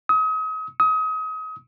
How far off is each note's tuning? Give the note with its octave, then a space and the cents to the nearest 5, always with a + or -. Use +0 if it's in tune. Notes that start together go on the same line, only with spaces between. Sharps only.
D#6 +35
D#6 +30